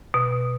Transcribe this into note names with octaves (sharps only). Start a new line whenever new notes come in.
B2